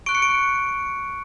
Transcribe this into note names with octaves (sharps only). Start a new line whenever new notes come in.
C#6 F#6 D7
C#7
D7